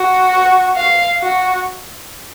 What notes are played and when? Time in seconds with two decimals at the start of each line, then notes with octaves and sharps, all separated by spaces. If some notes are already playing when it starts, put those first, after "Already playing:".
Already playing: F#4
0.31 F#5
0.77 F5
1.22 F#4